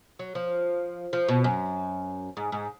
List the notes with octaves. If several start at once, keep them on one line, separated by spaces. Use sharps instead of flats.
F#3
F3
F3
B2
F#2
G#2
G#2